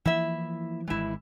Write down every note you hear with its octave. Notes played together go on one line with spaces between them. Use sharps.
E3 F3 A#3 E4 E5
G#1 E3 G#3 E4